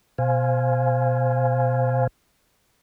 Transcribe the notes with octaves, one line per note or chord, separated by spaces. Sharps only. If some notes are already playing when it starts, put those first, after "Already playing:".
B2 C5 F5 G#5